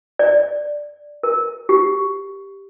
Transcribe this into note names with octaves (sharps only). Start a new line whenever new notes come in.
D5
A#4
G4